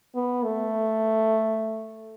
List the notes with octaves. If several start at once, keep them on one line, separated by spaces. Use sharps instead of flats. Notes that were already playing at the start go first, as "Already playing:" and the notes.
B3
A3